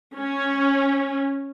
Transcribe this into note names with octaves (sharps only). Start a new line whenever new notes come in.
C#4